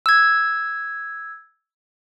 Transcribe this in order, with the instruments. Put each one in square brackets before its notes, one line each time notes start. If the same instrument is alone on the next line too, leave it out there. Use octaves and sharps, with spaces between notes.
[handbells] E6 G#6